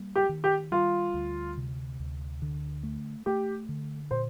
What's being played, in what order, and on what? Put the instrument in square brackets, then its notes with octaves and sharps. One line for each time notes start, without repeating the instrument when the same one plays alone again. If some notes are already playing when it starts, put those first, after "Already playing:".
Already playing: [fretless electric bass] G3 A#3
[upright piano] G4
[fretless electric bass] D#3
[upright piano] G4
[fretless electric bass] G3 [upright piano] F4
[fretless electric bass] D2
C3
D2
D3
A3
[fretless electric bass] A3 [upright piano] G4
[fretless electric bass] D3
[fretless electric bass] A#2 [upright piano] C5